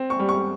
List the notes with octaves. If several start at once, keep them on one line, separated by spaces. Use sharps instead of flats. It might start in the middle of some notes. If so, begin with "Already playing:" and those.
Already playing: C4
C#6
G3
C#6